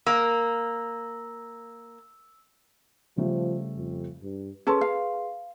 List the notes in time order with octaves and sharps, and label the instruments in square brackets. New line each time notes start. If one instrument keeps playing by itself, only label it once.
[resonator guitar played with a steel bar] A#3 [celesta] E6
[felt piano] C#3 G3 A3 [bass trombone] F3
[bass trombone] F2
G2
[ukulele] C#4 A4 A5 [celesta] G#4 B4 C6
[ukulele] F5